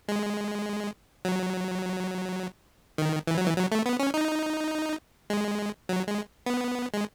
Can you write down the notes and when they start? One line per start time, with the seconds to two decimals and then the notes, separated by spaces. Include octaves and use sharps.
0.08 G#3
1.25 F#3
2.98 D#3
3.27 E3
3.38 F#3
3.47 E3
3.56 F#3
3.72 A3
3.86 B3
3.99 C#4
4.14 D#4
5.30 G#3
5.89 F#3
6.08 G#3
6.46 B3
6.94 G#3